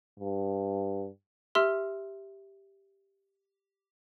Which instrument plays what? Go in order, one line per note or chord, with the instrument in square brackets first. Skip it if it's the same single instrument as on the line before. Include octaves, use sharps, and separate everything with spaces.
[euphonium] G2
[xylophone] G4 E5 C6 E6 F6